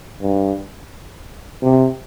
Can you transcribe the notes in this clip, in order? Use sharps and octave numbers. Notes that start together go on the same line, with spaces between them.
G2
C3